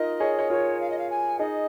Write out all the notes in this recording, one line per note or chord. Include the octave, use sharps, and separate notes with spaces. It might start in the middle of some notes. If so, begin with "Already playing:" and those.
Already playing: D#4 F4 A#4 D#5
G#4 C#5
C#5
F4 A#4 C#5
F5
D#5
F5
G#5
D#4 G#4 D#5